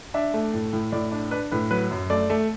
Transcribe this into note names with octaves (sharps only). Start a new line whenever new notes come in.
D4 E5
A3
A2
A2
A2 D5
D4
D4 B4
A2 B4
F#3 B4
F#2
A3 D5
A3